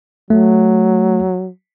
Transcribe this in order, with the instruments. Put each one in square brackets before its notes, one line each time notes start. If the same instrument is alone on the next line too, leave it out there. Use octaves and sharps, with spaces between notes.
[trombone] F#3 [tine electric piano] A3